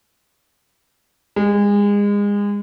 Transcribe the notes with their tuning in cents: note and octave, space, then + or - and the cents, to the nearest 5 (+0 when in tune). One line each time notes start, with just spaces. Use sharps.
G#3 -30